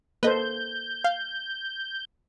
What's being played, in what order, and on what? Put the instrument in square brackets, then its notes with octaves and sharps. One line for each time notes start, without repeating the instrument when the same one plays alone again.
[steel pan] A#3 A4 C5 [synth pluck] B4 D#5 [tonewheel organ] G6
[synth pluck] F5